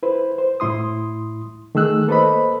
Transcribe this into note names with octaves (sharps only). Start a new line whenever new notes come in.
E4 B4 C5
C5
A2 E4 C6 D#6
D#3 A3 G#4 E6 F#6
A#3 A4 B4 C5 D#5 B5